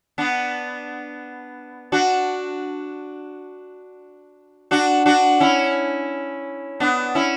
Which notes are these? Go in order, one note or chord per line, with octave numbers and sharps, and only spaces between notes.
B3 D4
D4 F#4
D4 F#4
D4 F#4
C#4 E4
B3 D4
C#4 E4